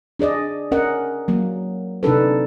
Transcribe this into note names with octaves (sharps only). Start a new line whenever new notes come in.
D4 G#4 D5 D#5
C#4 A#4 D#5 F#5
F#3 A#3
C3 D4 D#4 A4 B4